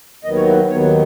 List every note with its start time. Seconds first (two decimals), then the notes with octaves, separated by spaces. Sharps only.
0.24 D#2 D#3 F#3 B3 D#5
0.36 C#5
0.48 E4
0.69 D#2 D#3 F#3 B3 C#5